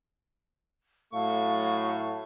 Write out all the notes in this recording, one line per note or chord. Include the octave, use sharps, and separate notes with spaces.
A2 F#3 A3 F5 C#6